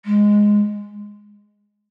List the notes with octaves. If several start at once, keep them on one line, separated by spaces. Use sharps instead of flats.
G#3